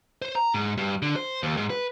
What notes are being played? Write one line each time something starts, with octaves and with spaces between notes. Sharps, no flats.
C5
A#5
G#2
G2
D3
C5
D#2
G#2
B4